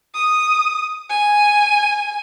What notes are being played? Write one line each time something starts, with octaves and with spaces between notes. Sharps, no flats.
D#6
G#5